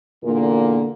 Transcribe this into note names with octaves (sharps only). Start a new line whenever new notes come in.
E2 A#2 D3 A#3